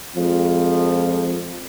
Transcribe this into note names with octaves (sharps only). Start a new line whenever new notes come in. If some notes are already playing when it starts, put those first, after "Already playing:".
F2 F3 G#3